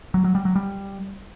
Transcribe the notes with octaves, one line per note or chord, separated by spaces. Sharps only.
F#3
F#3
G3
F#3
G3